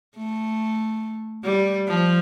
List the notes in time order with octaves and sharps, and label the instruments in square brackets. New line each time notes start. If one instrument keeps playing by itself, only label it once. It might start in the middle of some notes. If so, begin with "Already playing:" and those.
[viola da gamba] A3
G3
F3